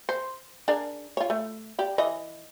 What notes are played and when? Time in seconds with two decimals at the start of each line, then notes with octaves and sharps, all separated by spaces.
0.09 C5
0.68 D4 G#4 A#4
1.17 F4 C#5
1.30 A3
1.79 G4 D5
1.98 E3 D#5